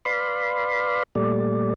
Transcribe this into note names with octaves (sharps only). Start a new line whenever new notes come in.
B4 D5 F5 B5 C6
A#2 G3 A3 D5